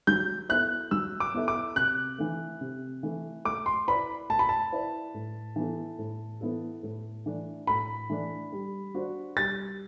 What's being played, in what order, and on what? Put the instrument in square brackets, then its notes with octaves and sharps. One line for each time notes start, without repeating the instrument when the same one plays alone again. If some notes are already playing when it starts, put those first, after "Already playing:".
[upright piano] F#3 [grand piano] G6
[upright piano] B3 E4 A4 E5 [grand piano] F#6
[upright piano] F#3 [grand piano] E6
[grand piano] D6
[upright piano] B3 E4 A4 E5
[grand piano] D6
[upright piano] C3 [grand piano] F#6
[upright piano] E3 A3
C3
E3 A3
[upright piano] A3 [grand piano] D6
[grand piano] C6
[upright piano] E4 B4 D5 [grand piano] B5
[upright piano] A3 [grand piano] A5
[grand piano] B5
A5
[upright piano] E4 B4 D5
A2
E3 B3 E4 A4
A2
E3 B3 E4 A4
A2
E3 A3 D4
[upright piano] A2 [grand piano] B5
[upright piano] E3 A3 D4
G3
D4 F#4 C5
[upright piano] G3 [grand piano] A6